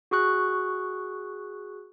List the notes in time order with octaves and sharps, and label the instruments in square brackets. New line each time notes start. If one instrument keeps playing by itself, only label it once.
[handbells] F#4 G#4 C#6 F#6